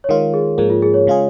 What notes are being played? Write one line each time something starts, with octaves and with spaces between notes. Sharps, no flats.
C#5
D#3 G#3 F4 A#4
G#4
G#2 F3 A#3 G#4
F4
G#4
C#5
C#3 G#3 F4 G#4